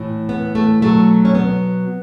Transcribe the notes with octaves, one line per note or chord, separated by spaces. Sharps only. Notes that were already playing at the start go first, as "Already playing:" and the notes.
Already playing: A2 E3
B3
A3
B2 F#3 A3
C#4
B3